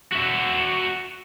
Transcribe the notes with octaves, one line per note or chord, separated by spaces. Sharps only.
F#4 E5